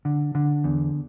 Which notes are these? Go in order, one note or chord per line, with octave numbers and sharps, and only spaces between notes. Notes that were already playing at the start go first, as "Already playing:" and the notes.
D3
D3
E2